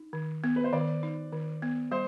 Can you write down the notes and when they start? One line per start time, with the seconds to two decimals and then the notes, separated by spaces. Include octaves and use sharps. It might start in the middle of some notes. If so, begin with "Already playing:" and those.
Already playing: D#4
0.13 D#3
0.44 B3
0.56 B4
0.64 C5
0.73 D#3 D5
1.03 D#4
1.32 D#3
1.62 B3
1.91 G3 C5